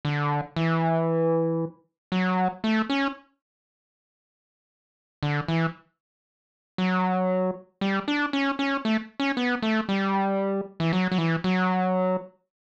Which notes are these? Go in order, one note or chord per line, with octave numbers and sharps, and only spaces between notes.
D3
E3
F#3
A3
C#4
D3
E3
F#3
G3
D4
C#4
C#4
A3
C#4
B3
A3
G3
E3
F#3
F#3
E3
F#3